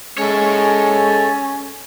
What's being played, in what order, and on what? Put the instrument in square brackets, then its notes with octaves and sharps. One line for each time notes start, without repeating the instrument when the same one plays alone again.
[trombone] G#3 [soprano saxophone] C#4 [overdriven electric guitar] A4 C#5